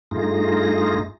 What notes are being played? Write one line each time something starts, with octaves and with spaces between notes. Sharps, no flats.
G2 A3 D#4 F4 G#4 A#6